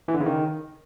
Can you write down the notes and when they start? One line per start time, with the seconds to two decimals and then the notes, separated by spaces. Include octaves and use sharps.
0.08 E3
0.14 D3
0.20 C#3
0.26 D#3